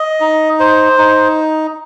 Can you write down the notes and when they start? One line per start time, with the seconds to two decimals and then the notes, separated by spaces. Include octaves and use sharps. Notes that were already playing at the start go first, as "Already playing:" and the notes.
Already playing: D#5
0.20 D#4
0.60 C5
0.98 D#4